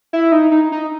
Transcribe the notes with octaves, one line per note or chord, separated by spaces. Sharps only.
E4
D#4
D#4
D#4